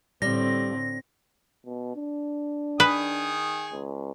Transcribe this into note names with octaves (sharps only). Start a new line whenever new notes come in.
A2 D3 G3 C4 A#6
B2
D4
D#3 G#4 B4 D#6
C#2